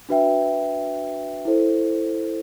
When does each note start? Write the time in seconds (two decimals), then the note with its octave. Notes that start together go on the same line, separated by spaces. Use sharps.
0.09 D4 F#4 B4 E5 G5
1.45 E4 A4 C5